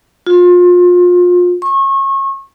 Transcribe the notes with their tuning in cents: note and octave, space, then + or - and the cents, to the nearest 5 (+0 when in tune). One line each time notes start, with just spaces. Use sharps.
F4 +30
C#6 -30